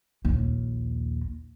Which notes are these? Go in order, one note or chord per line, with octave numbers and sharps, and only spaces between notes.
A#1 D#2